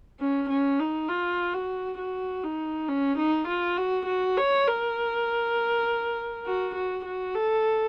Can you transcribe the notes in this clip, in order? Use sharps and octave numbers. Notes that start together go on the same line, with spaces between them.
C#4
C#4
D#4
F4
F#4
F#4
D#4
C#4
D#4
F4
F#4
F#4
C#5
A#4
F#4
F#4
F#4
A4